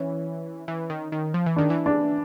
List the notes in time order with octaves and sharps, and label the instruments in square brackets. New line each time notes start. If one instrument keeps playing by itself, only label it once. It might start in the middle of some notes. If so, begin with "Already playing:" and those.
Already playing: [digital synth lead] E3 [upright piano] C#4
[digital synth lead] E3
D#3
D#3
F3
E3
[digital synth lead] D#3 [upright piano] D4
[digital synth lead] E3
[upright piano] D4